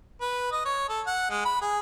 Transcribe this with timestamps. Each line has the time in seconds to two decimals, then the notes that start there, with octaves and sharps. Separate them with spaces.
0.21 B4
0.52 D#5
0.65 C#5
0.89 A4
1.07 F#5
1.30 G#3
1.45 B5
1.62 G#4